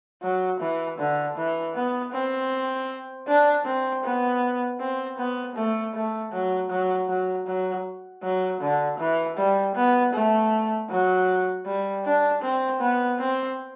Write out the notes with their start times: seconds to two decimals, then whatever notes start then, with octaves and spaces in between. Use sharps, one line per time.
0.22 F#3
0.60 E3
0.98 D3
1.36 E3
1.75 B3
2.13 C4
3.27 D4
3.66 C4
4.04 B3
4.80 C4
5.18 B3
5.56 A3
5.94 A3
6.32 F#3
6.70 F#3
7.09 F#3
7.47 F#3
8.23 F#3
8.61 D3
8.99 E3
9.37 G3
9.75 B3
10.13 A3
10.90 F#3
11.66 G3
12.04 D4
12.42 C4
12.80 B3
13.19 C4